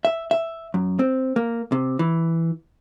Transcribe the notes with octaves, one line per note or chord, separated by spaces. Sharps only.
E5
E5
F#2
C4
A#3
C3
E3